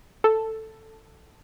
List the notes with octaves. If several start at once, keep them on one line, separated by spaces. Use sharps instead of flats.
A4